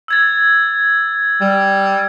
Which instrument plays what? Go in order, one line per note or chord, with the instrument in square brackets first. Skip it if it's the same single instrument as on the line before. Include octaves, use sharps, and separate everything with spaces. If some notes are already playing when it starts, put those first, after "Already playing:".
[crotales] E6 G#6 A6
[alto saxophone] G3